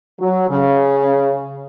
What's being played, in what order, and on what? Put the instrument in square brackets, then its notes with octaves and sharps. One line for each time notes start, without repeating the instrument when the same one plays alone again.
[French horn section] F#3
C#3